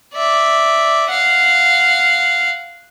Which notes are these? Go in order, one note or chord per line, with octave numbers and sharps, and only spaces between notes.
D5 E5
F5 F#5